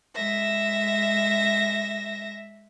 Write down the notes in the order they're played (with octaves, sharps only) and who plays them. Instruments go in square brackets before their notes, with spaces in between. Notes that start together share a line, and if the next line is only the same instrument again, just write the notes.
[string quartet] G#3 E5 A#6